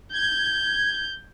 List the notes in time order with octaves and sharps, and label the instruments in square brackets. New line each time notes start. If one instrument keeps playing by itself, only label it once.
[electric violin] G6 [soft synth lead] G#6